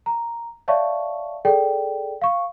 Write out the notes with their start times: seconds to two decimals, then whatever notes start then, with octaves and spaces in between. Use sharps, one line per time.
0.06 A#5
0.68 C#5 D5 E5 F5 A5 C#6
1.45 G#4 A4 D5 G5
2.22 F5 C#6